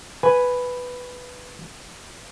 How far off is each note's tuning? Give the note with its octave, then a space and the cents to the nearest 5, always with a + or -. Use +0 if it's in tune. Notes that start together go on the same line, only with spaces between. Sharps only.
B4 +5 G#5 +0